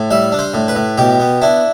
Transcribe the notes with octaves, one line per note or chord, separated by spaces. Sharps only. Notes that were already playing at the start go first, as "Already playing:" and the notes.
Already playing: A2
G3 E5
D4
C5
A2
B4
A2
B2 G4
B3
D4 E4